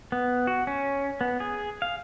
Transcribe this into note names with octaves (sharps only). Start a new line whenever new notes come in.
B3
F#4
C#4
B3
G#4
F5